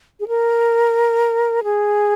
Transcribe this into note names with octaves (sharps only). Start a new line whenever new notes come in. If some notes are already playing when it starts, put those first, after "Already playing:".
G#4
A#4
G#4